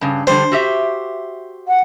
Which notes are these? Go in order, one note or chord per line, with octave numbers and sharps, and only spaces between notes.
G2 C#3
D3 G3 C5
F#4 G4 E5
F#5